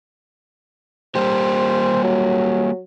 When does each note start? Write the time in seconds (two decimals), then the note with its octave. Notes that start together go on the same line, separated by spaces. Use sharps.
1.15 G3 A#3 G4 C5
2.03 F#3